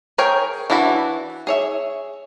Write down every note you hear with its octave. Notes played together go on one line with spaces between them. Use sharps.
G#4 A#4 C#5 G5
E3 D4 E4 F#4 B5
G#4 C#5 E5